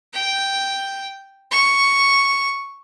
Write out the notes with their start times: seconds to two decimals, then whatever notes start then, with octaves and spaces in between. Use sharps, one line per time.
0.13 G5
1.51 C#6